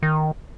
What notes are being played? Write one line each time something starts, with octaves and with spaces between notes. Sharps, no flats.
D#3